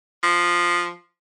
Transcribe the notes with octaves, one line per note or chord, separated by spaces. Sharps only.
F3